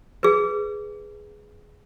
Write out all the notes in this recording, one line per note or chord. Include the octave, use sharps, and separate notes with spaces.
G#4 B4